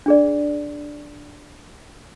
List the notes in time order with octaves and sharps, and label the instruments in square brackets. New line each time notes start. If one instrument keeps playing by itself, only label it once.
[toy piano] D4 G#4 D5